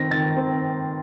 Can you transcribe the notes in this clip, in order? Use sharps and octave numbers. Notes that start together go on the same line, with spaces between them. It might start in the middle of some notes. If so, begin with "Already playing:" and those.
Already playing: D#3 C4 A#6
D#3 A6
C4